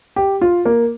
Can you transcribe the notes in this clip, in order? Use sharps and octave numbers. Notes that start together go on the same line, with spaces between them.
G4
F4
A#3